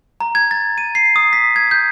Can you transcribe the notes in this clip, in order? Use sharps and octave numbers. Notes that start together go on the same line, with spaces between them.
A#5
G#6
A6
D#7
C7
D#6
B6
G#6
G6